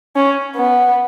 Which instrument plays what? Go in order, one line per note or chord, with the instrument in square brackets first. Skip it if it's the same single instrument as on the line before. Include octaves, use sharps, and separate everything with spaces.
[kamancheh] C#4
B3